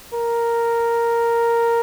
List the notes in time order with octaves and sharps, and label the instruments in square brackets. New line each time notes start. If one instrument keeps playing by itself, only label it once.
[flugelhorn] A#4